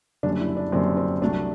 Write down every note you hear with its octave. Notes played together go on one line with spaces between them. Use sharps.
F#1 F#2 D3 G3 D4
E4
D4
F#1 F#2 D3 G3 C4
C4
C2 C3 F#3 A3 D4